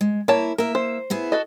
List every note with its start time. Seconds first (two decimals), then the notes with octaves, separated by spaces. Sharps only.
0.01 G#3
0.28 A#3 E4 C#5 A5
0.58 A#3 A#4 E5
0.75 C5
1.10 B3 E4 G#4
1.32 F#4 A4 D#5